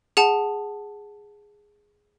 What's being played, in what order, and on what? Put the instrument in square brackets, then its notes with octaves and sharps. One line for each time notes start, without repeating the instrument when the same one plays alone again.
[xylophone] G#4 F#5 A5